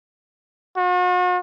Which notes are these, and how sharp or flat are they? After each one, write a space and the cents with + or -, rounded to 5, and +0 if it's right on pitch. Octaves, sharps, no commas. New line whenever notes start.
F#4 -45